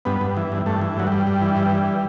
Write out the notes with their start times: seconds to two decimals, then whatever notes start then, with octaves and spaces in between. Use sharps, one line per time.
0.05 G2 B3
0.21 G2
0.37 E3
0.52 G2
0.66 G2 A3
0.81 E3
0.97 G2 F#3
1.07 G3
1.12 G2
1.27 G2
1.41 E3
1.57 G2
1.72 E3